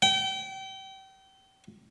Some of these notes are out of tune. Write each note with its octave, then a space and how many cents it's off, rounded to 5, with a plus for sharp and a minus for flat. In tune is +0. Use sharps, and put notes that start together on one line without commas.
G5 -30